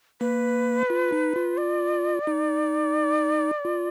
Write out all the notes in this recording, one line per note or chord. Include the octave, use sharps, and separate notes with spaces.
A#3 B4
F4
D#4
F4
D5
D#4
F4